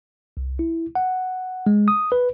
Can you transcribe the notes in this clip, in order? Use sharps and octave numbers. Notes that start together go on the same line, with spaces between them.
C2
E4
F#5
G#3
D#6
B4